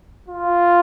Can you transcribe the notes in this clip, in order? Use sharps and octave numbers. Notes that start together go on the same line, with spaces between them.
F4